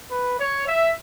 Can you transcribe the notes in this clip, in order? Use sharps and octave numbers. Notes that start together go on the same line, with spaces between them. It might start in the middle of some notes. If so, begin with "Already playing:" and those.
B4
C#5
E5